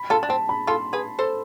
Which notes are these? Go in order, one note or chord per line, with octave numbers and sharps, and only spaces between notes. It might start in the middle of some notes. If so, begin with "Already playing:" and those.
Already playing: B5
F4 A4 A5
D4
C4 A5
B5
F4 A4 C6
G#4 B4
A4 C5